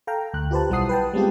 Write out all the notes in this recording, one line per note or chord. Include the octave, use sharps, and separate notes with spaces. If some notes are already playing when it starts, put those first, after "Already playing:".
A4 F5 G5 A#5
D2 F#6
F4 G4 B4 C5 A5
B1 G3 E4 F#5 D#6 C7
B4 G5 A5
G3 G#3 B3 C4 F4 G4